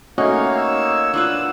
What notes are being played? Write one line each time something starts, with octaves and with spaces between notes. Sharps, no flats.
A3 A#3 C#4 D#4 F#4 C#5 D#5 F5
E6
D4 F4 B4 F#5 E6